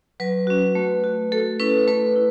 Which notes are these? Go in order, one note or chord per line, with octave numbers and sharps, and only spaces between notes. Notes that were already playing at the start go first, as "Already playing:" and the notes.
F#3 B4
C#4 F#4
A3
F#4
A3 A4
C#4 E4 B4
A3 B4
E4